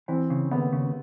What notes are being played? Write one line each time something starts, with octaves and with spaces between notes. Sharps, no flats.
E3 C4
C#3
D#2 B3
C#3